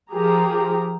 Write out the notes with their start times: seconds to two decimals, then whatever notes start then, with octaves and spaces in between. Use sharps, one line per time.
0.11 F3 G4 G#4 A#4 A#5